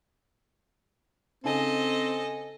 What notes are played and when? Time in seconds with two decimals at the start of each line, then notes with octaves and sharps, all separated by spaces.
1.44 C#3 C4 D#4 A4 D#5 G#5